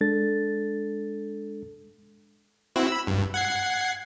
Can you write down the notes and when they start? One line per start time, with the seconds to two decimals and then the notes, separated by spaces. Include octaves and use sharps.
0.01 G#3 D4 A4 A6
2.76 C4 E4 F#4
2.88 B5 E6
3.07 G2
3.34 F#5 G#6 C7